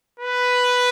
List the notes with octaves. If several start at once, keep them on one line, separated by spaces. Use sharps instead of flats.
B4